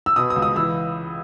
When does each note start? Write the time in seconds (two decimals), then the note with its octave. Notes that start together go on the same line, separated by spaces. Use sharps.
0.06 E6
0.16 B2 D#6
0.30 D#6
0.36 C#2
0.42 D#6
0.56 E3 E6